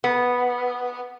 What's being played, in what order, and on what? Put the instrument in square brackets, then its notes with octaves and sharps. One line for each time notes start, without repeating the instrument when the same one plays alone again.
[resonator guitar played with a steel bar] B3